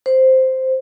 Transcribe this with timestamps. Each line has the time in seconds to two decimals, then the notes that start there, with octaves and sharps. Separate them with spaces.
0.06 C5